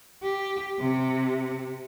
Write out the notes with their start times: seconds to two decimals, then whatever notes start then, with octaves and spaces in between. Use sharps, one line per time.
0.22 G4
0.79 C3